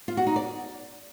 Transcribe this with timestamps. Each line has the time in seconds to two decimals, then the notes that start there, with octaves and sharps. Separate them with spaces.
0.08 F4
0.17 F#4
0.27 D#4
0.36 D5